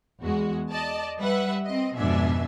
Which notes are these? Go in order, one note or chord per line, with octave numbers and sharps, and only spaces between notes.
E2 G#3 F#4
D5 D#5 A5
G3 B4 E5 F#5
C4 D#5
F2 G#2 B2 D4 E5 G#5